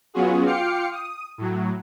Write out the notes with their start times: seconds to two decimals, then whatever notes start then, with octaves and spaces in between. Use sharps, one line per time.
0.14 F#3 B3 C#4 F4 F#4 G#4
0.46 F4 G5 D6 F6 C7 C#7
0.92 D#6
1.38 A2 F#3